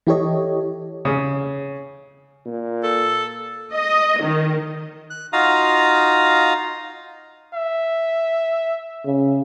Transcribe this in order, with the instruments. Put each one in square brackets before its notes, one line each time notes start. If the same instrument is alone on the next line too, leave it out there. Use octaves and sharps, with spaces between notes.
[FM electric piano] E3 E4 G4 A4 C#5 D#5
[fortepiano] C#3
[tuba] A#2
[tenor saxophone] A4
[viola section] D#5
D#3
[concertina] F#6
D#4 F4 F#4 F5 A#5 D#6
[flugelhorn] E5
[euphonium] C#3